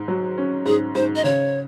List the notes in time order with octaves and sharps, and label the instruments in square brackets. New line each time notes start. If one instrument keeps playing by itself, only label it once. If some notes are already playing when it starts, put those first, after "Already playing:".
Already playing: [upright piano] G#2
F#3
C#4
[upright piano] G#2 [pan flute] G#4
[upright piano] G#2 [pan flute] C5
[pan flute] D#5
[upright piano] C#3 [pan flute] C#5